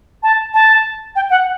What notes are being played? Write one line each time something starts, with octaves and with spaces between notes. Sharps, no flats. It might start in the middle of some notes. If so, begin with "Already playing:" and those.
A5
A5
G5
F#5